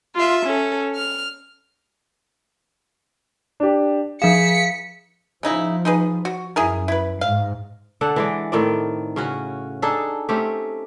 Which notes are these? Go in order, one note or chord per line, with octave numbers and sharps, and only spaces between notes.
F4 E5
C#4 A4
F6
D4 G4
F3 G#4 F5 B6 C#7
C#3 F3 D#4 E4
D#4 G#4 B4
F#4
F#2 E4 G#4 A#4
E4 B4
G#2 F5
D3 D4 A4 F#5
E3 G#3 D5
A2 D#3 C4 D5
C#3 C#4 F#4
D4 D#4 G#4 A4
A3 C4 C#4 G4